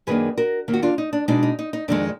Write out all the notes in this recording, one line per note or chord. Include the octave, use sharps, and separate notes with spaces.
F#2 D#3 A#3 D4 G#4 B4
F#4 A#4
D#2 D#3 A#3
F#4
D4 F4
D#4
D4
B2 G#3 D4 D#4
D#4
D#4
D#4
F2 D#3 G#3 D4